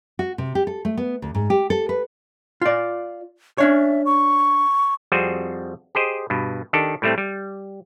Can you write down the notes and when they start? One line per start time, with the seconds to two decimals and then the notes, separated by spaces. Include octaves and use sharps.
0.19 F#4
0.38 C3
0.55 G4
0.67 A4
0.85 A3
0.97 B3
1.22 D2
1.35 G#2
1.50 G4
1.70 A4
1.89 B4
2.61 F4 D5
3.58 C#4 D4 C#5 E5
4.06 C#6
5.12 F2 G3 C4 F#4 G#4 C5
5.95 G4 G#4 C5 D#5
6.30 G2 B2
6.73 D#3 D4 G4 A4
7.02 A2 G3 A3 C4
7.18 G3